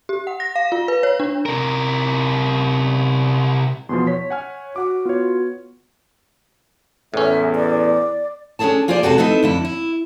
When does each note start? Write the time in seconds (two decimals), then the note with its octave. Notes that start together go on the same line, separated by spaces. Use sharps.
0.09 G4
0.27 F#5
0.40 A#6
0.56 F5
0.72 F4
0.88 B4
1.03 C#5
1.20 D4
1.46 C3 A#4
3.89 E2 B2 F3 C6
4.07 C#5 B6
4.30 F#5 G#5 F6
4.76 F#4 F#5 D6
5.05 B3 F4 C#5
7.14 E2 A2 C#4 E5
7.55 D5
8.59 C#4 D4 E4 G#4 A4 A5
8.88 A#3 F4 G#4 A4 C5 D5
9.03 E2 G#2 C3 G#3 F#4 A4
9.18 A3 B3 C4 D#4 E4
9.43 F2 D3 E4
9.65 E4